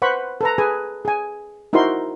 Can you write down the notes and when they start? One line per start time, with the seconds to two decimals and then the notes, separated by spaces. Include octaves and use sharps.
0.02 B4 C5 F#5 B5 C#6
0.41 A4 B4 A#5
0.58 G#4 B4 G#5
1.05 G#4 G#5
1.73 D#4 E4 F#4 A#4 C5 C6